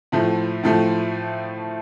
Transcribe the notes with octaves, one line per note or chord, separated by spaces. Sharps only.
A2 F3 A3
A2 F3 A3